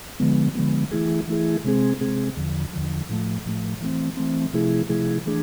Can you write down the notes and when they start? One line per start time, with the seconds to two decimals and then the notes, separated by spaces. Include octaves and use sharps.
0.20 D3 F3 G#3 B3
0.55 D3 F3 G#3 B3
0.91 E3 A3 E4 G#4
1.27 E3 A3 E4 G#4
1.64 C3 G#3 C4 G#4
2.01 C3 G#3 C4 G#4
2.37 E2 D3 F3
2.73 E2 D3 F3
3.10 A2 F3 A3
3.46 A2 F3 A3
3.81 E3 A3 C4
4.17 E3 A3 C4
4.53 C3 F3 A3 E4 G#4
4.89 C3 F3 A3 E4 G#4
5.26 E3 A3 D4 G#4